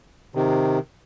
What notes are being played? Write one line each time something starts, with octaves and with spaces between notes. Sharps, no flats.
C3 D#3